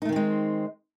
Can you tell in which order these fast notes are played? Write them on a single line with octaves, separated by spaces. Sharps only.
D#4 A3 D#3 C4 G#3